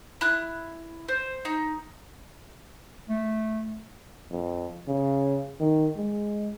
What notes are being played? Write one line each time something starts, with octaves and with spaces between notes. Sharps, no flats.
E4 F#6
C5
D#4
A3
F2
C#3
D#3
G#3